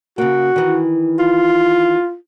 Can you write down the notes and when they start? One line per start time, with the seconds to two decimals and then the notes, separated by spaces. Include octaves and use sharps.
0.18 C#3 A#3 F#4
0.56 D#3 E3
1.19 F4